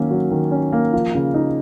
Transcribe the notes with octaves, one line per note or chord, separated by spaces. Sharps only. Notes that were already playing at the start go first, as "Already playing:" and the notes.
Already playing: D#3 F#3 A#3 C#4
F#3
D#3
C#4
A#3
F3
C#3
D#4